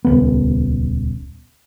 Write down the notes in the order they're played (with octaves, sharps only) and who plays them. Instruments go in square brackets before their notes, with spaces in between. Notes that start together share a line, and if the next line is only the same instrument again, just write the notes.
[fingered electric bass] D#1 C#2 B3